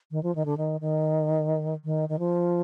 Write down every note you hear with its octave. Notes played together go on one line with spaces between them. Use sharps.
D#3
F3
D#3
D3
D#3
D#3
D#3
D#3
F3